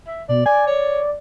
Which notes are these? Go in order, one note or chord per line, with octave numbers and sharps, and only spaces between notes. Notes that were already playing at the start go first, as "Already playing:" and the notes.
E5
B2 D5
D5 G#5
C#5